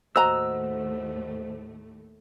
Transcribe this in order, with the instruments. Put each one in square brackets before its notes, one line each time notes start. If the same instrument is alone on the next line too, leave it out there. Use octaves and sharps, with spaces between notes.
[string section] D#2 A2 A3 [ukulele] F#4 D#5 A#5 [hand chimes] C5 [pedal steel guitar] E6